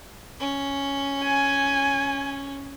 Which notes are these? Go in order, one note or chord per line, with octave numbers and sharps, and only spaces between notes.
C#4
G#5